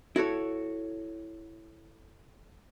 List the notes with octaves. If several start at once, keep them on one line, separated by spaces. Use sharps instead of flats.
E4 F#4 A4 C#5